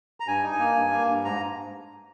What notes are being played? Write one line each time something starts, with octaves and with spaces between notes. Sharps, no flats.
A#5
G2 G#5
D#4
G#5
A#3
G2
A#3
G2
G#2 A#5